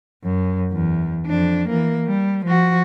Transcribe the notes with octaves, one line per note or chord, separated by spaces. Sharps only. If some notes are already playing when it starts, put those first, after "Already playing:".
F#2
E2
F2 D4
E3 A#3
G3
F3 F#4